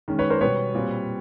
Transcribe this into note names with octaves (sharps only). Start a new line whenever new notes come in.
D#3 G#3 C#4
B4 C#5
A#4 C5
B2 G3 B3 B4 C#5
A#2 G3 C4